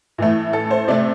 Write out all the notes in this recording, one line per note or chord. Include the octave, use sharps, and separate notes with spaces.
A2 E3 A3
A4
C5
C3 A3 D5